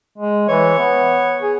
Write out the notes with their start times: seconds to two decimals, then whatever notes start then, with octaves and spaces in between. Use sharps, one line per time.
0.18 G#3
0.48 E3 C#5
0.78 B3
1.41 G#4